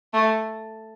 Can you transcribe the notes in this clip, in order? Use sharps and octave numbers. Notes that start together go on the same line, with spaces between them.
A3